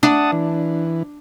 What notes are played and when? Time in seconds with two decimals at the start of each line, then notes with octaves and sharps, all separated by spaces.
0.03 D4 F#5 A5 D#6
0.32 E3